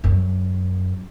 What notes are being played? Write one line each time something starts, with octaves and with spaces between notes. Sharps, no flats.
F#2